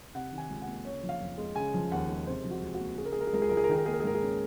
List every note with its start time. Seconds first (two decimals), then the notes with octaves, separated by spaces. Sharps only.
0.15 C3 F#5
0.32 D#3
0.38 G#5
0.50 C#2
0.62 F#5
0.67 A#3
0.85 C#3 C#5
1.03 F3
1.09 F5
1.21 F2
1.38 G#3
1.56 C#3 G#5
1.74 F3
1.92 D#2 F#5
2.09 G#3
2.27 C3 C5
2.44 F3
2.51 F#4
2.62 C#2
2.74 F#4
2.80 A#3
2.98 C#3 G#4
3.05 A#4
3.12 G#4
3.16 G#3 A#4
3.27 G#4
3.33 C#2 A#4
3.42 G#4
3.49 C#2 A#4
3.57 G#4
3.64 A#4
3.69 D#3 G#4
3.78 A#4
3.86 A#3 G#4
3.93 A#4
4.00 G#4
4.04 G#2 A#4
4.15 G#4
4.22 C#4